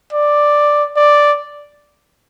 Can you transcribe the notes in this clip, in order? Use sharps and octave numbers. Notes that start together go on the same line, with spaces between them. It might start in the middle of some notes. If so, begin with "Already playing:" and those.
D5
D5